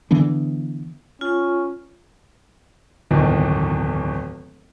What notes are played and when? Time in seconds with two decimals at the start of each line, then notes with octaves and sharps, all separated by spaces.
0.11 D3 E3 B3 D4
1.21 C#4 F4
3.11 D1 G1 E2 D#3